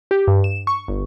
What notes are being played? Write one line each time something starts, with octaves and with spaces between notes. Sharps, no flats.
G4
G2
E7
C#6
G1